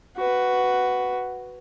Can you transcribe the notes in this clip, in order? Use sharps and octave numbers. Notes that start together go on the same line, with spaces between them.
F#4 B4